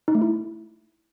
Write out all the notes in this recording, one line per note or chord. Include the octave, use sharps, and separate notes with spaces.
D#4
A3
E4